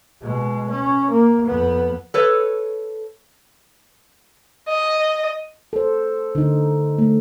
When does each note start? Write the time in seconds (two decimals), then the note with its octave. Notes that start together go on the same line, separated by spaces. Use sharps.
0.22 B2 G#3
0.70 C#4
1.10 A#3
1.46 F2 B3
2.14 A4 B4 C#5
4.68 D#5
5.73 A4 C5
6.35 D3 D#4
6.98 A3